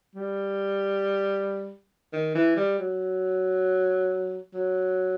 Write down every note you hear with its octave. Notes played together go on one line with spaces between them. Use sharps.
G3
D#3
E3
G3
F#3
F#3